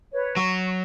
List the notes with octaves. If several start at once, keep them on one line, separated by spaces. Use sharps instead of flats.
B4 C#5
F#3 C#6